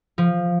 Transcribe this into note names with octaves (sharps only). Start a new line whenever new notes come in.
F3